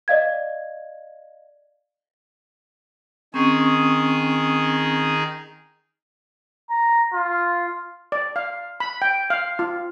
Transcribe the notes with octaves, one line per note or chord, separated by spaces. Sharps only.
D5 D#5 F5 G#6
D#3 C4 C#4 D#4 G#4 C#6
A#5
F4
D5
F5
B5
G5
F5
F4